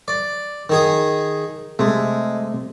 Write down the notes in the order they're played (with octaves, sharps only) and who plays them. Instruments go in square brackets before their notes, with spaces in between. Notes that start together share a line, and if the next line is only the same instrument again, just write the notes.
[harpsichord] D5
D#3 G#4 D#6
[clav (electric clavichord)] C3 A3 [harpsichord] G#3